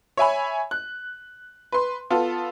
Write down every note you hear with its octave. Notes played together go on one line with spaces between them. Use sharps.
C#5 E5 G#5 B5
F#6
B4 C6
B3 F4 A4